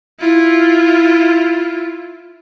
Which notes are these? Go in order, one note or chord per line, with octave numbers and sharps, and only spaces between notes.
E4 F4